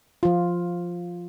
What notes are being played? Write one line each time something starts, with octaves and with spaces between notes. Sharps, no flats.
F3 F4